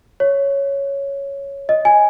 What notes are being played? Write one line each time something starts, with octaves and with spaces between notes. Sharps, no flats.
C#5
D#5
G#5